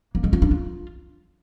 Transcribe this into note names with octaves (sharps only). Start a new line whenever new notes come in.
A#3
G#3
F4
D4
F4